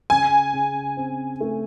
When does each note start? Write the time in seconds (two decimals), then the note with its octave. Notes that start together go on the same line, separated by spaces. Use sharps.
0.10 C#3 G#5
0.53 C#3
0.97 C4
1.40 A3